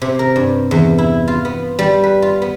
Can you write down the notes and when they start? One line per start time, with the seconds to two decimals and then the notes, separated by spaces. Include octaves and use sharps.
0.02 C3
0.19 A#4
0.36 G2
0.71 E2
0.98 E4
1.28 F4
1.45 B3
1.79 G3
2.04 B4
2.22 F4
2.42 B3